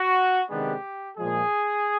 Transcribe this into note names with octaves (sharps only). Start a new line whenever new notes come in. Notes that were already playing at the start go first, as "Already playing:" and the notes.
Already playing: F#4
C3 D#3 G#3 B3 D4 G4
A#2 F3 G#3 G#4